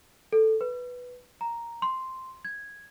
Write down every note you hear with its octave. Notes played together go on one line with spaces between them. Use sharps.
A4
B4
A#5
C6
G#6